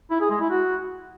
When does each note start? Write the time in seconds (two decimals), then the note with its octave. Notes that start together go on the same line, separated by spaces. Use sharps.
0.10 E4
0.20 G#4
0.30 G#3
0.40 E4
0.50 F#4